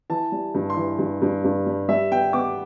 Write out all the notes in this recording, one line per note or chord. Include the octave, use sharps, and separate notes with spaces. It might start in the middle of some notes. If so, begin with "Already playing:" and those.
E3 A5
G3
G2
C6
E3
G2
G2
G2
G3
G3 E5
B3 G5
B3 D6